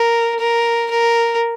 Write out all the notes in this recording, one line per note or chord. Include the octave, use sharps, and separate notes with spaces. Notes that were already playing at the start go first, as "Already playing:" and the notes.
Already playing: A#4
A#4
A#4